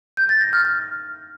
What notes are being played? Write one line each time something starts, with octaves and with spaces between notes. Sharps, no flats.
G6
A6
A#6
F6
F6